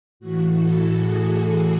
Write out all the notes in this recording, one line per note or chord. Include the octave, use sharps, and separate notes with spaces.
A2 E3 F#4
A4
G#4